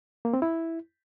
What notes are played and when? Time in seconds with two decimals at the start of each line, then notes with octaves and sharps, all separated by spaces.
0.25 A#3
0.34 C4
0.42 E4